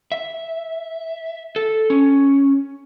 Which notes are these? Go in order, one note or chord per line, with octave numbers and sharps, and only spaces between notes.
E5
A4
C#4